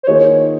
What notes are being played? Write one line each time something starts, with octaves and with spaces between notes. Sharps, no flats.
C5
D#3 A#3 F4 G#4 C#5 D#5